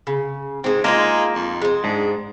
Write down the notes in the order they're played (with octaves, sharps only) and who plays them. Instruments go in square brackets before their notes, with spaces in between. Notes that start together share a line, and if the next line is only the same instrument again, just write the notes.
[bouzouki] C#3
[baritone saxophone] G#2 [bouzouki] G#3 C4
[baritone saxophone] G#3 [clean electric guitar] A#3 [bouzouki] D4 D#4 F4
[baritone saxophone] F2
[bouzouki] G#3 C4
[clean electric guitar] G#2 [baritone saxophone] D4